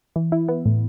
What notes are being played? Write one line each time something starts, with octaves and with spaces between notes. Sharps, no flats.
E3
E4
B3
A2